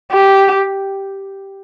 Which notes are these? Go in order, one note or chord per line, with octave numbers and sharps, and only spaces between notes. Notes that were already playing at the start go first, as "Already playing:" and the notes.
G4